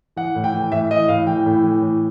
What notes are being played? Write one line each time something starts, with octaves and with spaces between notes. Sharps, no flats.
E3 F#5
A2
G5
E3
A2 E5
E3 D#5
A2 F5
E3 G5
A2
E3
A2